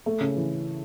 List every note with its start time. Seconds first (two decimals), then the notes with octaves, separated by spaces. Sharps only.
0.06 A3
0.21 C#3
0.36 E3